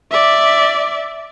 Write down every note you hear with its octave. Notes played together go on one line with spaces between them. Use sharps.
D5 E5